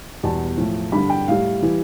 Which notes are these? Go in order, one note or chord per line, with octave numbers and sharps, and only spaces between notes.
E2 B2 G3 A5
A2 F3
G2 D3 G3 B5
G5
A2 G3 F5
E3 G3